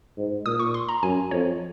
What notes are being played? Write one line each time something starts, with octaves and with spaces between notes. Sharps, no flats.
G#2
A#2 D#6
C#6
C6
A#5
F#2 G#5
F2 C#5